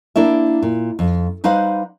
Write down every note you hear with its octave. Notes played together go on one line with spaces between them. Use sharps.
A#3 D4 E4 E5
A#2
F2
G3 D#4 B4 C5 F5 F#5